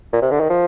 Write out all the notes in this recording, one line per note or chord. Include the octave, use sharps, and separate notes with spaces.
A#2
C3
D3
D#3
F3